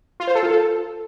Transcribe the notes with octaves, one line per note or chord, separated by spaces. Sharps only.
F4
C5
A4
F4
A4